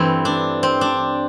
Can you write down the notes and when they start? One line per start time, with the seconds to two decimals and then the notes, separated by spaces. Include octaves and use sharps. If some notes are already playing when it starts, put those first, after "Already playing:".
Already playing: G2 E3 A3 C4
0.25 D4
0.63 C4
0.81 D4